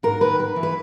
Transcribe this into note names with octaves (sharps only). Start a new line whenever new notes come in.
G#2 A#4
D#3 B4
G#2 B4
E3
B4